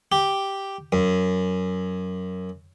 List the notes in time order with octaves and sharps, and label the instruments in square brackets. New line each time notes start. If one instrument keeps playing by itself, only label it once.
[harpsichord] G4
F#2